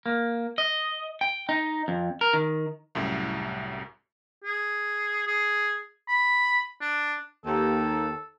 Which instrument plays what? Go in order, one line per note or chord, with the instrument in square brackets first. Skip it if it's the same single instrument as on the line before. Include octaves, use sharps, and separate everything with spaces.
[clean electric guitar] A#3
D#5
G5
D#4
F2
A#4
D#3
[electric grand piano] C2 F#2 A2
[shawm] G#4
G#4
B5
D4
[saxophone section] D#2 [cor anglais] A4